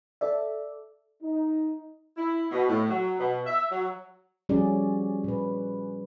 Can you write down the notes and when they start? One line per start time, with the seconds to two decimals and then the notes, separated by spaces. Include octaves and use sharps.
0.21 A4 D5 E5
1.22 D#4
2.16 E4
2.51 B2
2.69 A2
2.89 F#3
3.18 B2
3.46 E5
3.70 F#3
4.49 F3 G3 C#4 F#4 G#4 D5
5.24 A#2 B4